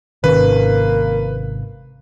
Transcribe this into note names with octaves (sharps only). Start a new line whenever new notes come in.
G#1 G#2 C3 D#3 A#3 C#4 B4